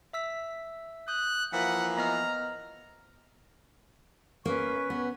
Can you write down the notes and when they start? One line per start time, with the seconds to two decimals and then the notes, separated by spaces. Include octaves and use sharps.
0.13 E5 E6 B6
1.08 D#6 F#6 G6
1.53 E3 F3 A#3 F#5 B6
1.98 B3 D#5 A#5 F6
4.45 A#3 C#4 B4 C#6
4.90 B3